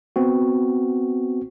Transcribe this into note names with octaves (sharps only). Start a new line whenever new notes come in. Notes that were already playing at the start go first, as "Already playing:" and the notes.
B3 C4 F#4